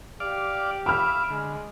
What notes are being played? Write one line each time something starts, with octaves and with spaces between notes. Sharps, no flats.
G4 D5 F5
E5 F5 B5 D6 F6
D3 G#3